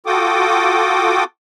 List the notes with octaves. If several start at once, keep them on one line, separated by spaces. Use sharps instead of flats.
F4 F#4 A4 G5 D6 D#6